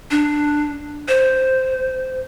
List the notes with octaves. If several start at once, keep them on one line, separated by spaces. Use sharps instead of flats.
D4
C5